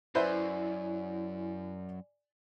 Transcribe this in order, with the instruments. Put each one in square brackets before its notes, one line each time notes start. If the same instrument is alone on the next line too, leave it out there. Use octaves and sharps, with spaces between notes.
[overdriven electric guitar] F#2 [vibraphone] E4 [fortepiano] B4 C5 E5 [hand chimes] D5 G#5